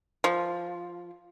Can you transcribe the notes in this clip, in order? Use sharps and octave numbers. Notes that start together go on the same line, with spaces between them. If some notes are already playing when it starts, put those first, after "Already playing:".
F3